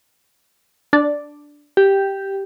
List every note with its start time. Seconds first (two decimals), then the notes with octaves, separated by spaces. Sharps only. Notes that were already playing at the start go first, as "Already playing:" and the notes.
0.93 D4 D5
1.77 G4